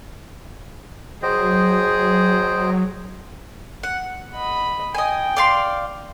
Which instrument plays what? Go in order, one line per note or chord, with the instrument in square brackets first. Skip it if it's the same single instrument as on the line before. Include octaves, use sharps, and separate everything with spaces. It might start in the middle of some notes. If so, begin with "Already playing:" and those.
[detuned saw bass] F#3 [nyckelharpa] G#4 [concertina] C5 D#5 G5
[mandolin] F#5
[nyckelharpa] D#5 B5
[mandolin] D#5 G#5 [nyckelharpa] G5
[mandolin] D5 F5 C6